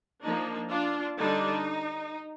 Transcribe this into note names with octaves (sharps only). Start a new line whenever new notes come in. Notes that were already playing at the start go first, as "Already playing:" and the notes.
F3 A#3 D4 D#4
D4 F4
D3 G3 D4 D#4